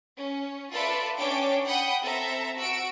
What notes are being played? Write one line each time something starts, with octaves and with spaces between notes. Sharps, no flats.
C#4
F4 A4 B4 D5 E5 B5
C#4 D4 C#5 G5 D6
F#5 G5 B5 D#6 G6
C4 A4 E5 A#5
F#4 E6 D7